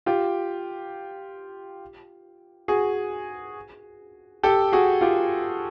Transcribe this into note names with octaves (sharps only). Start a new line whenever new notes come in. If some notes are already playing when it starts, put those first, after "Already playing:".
F4 G4
F#4 G#4
G4 A4
F#4 G#4
F4 G4